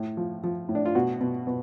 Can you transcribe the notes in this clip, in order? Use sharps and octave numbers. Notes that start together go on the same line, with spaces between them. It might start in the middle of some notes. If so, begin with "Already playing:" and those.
Already playing: A2
F3
F3
A2
D4
F4
B2 F#4
B2
B2